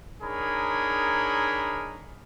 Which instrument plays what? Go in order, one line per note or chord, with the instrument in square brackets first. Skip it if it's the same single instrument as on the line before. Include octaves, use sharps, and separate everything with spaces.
[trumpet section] D4 D#4 G#4 A#4 C#5 B5